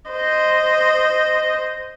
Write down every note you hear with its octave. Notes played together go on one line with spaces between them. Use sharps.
C5 D#5